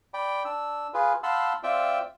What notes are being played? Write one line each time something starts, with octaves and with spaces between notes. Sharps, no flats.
D5 G5 B5
D4 E6
F4 G#4 B4
F5 F#5 A5 B5 C6 E6
C4 F4 D5 E5 G5